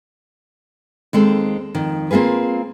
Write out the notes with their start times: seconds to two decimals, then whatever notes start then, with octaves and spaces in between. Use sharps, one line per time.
1.13 D#2 G#3 C4 A4
1.75 F2 D#3
2.11 A#3 C4 F4 G#4 B4